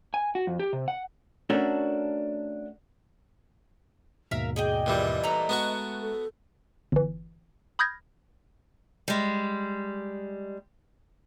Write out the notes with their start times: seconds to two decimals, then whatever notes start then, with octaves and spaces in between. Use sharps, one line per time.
0.14 G#5
0.35 F#4
0.47 F2
0.60 G4
0.73 C3
0.88 F#5
1.50 A3 C#4 D4 F#4 A4 A#4
4.31 D#2 G#2 B2 A#4 E5 F5
4.56 G#4 D5 D#5 G5
4.86 A#2 E3 G3
5.24 A3 B4 A#5
5.49 G#3 B3 F#4 C#6 F#6
6.01 A4
6.92 G1 E3
7.79 B5 D#6 F6 G6 G#6 A#6
9.08 G3 G#3